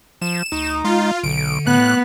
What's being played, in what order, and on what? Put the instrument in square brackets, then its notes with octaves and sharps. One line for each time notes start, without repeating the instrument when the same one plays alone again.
[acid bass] F3 [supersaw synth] E7
[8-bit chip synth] D2 [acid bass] D#4
[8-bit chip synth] G#3 [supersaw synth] F4
[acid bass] B1 [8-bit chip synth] D3 [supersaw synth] D7
[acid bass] A2 [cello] B3 [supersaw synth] F#6